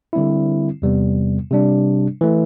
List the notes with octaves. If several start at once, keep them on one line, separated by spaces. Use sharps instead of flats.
D3 G3 C4 E4
E2 C3 G3 B3
C3 G3 D4
E3 A3